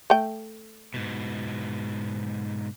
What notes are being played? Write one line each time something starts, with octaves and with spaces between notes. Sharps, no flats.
A3 G5
G#2 B2